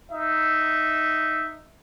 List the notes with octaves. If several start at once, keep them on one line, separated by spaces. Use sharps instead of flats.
D#4 E5